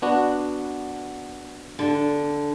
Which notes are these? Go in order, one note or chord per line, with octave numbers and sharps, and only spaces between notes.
B3 D4 F#4
D3